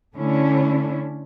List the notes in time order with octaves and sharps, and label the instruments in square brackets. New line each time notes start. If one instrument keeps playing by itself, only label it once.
[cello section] D3 A3 C#4 D4 E4